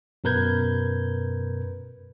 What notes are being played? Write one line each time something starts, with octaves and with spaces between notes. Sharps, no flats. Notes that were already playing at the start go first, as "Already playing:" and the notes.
F#2 B2 A#4 B4 G6 G#6